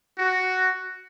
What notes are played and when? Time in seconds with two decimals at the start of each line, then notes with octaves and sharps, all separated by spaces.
0.18 F#4